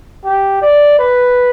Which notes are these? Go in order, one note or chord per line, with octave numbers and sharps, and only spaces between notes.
G4
D5
B4